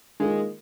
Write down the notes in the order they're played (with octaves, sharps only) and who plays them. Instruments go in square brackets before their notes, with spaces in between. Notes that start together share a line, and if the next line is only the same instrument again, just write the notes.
[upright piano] D#3 A#3 F4 G#4 [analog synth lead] G#3